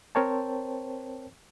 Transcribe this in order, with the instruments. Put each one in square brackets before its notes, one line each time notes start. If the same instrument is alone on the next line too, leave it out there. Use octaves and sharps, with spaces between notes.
[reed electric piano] C4 A#4 C5 C#5 G5 A5